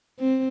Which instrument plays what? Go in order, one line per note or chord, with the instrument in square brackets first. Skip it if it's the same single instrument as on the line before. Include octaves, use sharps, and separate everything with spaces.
[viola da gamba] C4